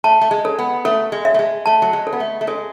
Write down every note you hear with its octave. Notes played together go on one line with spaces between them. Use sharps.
A3 A5
A3
G#3
A4
B3
A3 A4
G#3
E5
A3
G#3
A3 A5
F#3
G#3
A4
B3
A3
A3
G#3 A4